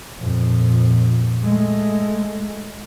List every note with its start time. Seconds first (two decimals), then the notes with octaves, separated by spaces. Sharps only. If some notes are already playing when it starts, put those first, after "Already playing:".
0.16 F2 A#2
1.44 G#3 A3